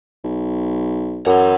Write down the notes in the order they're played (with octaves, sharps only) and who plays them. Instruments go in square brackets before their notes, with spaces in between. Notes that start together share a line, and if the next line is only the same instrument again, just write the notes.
[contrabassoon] B1
[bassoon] F#2 [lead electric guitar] E3 F#5